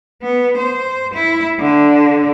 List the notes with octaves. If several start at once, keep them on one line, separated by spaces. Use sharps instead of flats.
B3
C5
E4
D3